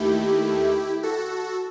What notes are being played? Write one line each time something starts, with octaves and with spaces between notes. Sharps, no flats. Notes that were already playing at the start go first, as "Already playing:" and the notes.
Already playing: D#2 D#3 A3 E4 G4
F#4 A4